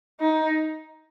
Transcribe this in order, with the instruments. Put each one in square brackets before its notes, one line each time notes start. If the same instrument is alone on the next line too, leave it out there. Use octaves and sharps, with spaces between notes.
[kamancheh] D#4